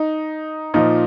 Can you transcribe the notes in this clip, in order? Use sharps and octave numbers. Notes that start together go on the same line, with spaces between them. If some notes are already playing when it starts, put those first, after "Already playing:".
Already playing: D#4
A#2 F3 D#4